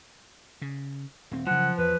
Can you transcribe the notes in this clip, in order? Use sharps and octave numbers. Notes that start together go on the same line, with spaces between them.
C#3
D#1 C4
C#3 F3 F#3 F#5
E2 B4